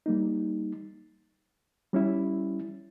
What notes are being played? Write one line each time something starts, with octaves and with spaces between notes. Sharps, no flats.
G3 A#3 D#4
G3 C#4 E4